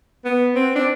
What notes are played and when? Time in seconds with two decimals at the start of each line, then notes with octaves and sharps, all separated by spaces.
0.25 B3
0.56 C4
0.76 D4